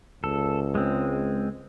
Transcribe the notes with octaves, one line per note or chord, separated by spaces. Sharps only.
C#2 A4
G#3 C4